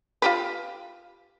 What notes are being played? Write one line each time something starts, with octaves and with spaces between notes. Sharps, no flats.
F4 G4 B4